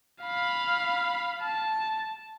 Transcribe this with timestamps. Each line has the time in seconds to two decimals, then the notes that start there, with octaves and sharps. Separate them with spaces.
0.22 F5 B5
1.43 A5